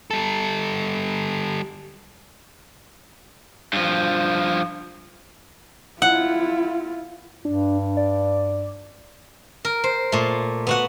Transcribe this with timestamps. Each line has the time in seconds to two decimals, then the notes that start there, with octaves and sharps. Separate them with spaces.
0.11 G3 A4
3.73 G2 F3
6.02 E4 F4 F#5
7.45 G2 D4
7.97 D5
9.65 A#4
9.84 C5
10.12 A#2 A3
10.67 B3 F#4 F#5